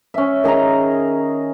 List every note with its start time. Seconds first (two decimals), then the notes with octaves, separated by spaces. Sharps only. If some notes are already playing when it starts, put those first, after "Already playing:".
0.14 C#4 E5
0.44 D#3 G#4 D#5 A#5